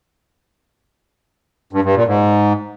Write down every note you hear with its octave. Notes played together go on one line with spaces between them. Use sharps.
G2
G2
A#2
G#2